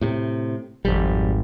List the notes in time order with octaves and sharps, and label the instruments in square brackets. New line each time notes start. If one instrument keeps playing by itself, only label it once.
[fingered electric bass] A2 C3
[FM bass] G#1 [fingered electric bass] F2 G3